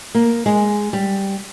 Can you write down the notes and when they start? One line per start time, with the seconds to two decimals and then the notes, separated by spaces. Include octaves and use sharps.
0.15 A#3
0.46 G#3
0.93 G3